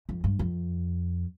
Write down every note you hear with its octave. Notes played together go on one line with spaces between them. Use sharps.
F2
G2
F2